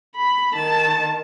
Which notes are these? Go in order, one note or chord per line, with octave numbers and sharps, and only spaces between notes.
B5
D#3 A5